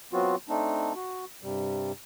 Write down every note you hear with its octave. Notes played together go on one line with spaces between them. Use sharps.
F#3 B3 C4 F4 F#4
A3 C4 D4 D#4
F#4
G2 C3 G3